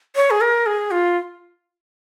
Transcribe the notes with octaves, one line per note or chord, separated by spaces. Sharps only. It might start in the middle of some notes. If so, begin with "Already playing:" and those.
C#5
G#4
A#4
G#4
F4